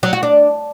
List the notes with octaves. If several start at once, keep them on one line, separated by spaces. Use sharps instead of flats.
F#3
F#4
D4